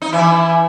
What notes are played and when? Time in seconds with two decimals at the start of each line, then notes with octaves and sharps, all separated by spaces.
0.02 D#4
0.12 E3 E4